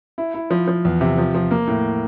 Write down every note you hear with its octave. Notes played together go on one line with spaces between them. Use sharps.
E4
E4
F3
F3
E2
C3
F3
F3
A#3
A2